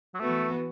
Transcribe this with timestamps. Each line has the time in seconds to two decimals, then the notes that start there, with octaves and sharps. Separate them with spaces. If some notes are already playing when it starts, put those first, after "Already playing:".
0.15 F#3
0.19 E3 A3 B3 F#4 B4